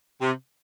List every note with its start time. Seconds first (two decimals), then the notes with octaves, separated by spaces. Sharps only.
0.21 C3